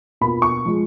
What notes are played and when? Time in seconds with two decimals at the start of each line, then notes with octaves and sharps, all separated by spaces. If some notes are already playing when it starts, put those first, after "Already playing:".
0.21 B2 A#3 F4 B5
0.42 C#6
0.66 F3 G#3